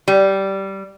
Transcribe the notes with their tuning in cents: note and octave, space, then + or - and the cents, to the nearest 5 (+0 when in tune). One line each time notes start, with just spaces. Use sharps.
G3 -10